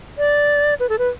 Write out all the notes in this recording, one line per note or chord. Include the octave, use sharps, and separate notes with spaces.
D5
B4
A4
B4